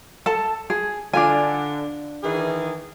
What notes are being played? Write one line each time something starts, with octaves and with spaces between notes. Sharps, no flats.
A4 A5
G#4
D3 D4 F4 G#5
D#3 E3 G#4